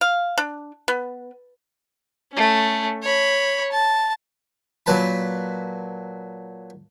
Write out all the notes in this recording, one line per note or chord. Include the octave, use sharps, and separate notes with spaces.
F5
D4
B3
A3 C#4
C#5 B5
A5
A#2 F#3 B4 A5 B5